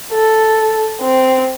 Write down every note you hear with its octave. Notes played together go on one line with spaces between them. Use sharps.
A4
C4